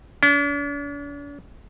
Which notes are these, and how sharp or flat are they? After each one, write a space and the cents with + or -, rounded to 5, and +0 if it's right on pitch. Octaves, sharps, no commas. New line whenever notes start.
D4 -45